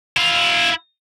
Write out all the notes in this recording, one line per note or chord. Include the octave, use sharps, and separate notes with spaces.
E4 F5